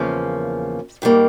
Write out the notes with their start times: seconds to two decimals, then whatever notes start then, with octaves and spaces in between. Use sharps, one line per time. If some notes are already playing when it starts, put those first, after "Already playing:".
Already playing: E2 C#3 F3 A#3 C#4
1.02 G#2 D#3 G3 A#3